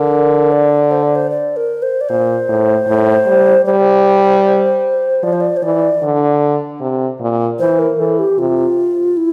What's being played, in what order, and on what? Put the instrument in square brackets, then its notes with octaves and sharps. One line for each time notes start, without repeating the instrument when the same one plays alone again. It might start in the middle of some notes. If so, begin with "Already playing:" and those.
Already playing: [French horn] D3 [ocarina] A#4
[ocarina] D5
C5
D5
C5
D5
A#4
C5
D5
[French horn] A#2 [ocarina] C5
[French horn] A2
A2
G3
[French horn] G3 [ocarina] C5
[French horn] F3 [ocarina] D5
[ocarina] C5
D5
C5
[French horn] E3 [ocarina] D5
[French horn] D3
C3
A#2
[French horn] E3 [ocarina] C5
[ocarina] A#4
[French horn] E3 [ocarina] A4
[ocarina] G4
[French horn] C3 [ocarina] F4
[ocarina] E4